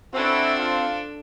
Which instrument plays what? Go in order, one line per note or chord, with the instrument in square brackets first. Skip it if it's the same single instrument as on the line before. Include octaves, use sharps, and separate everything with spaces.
[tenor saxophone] C4 [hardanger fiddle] D4 A4 [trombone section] E4 F#4
[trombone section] F4